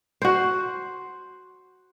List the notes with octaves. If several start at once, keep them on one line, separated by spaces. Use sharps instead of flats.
F#4 C5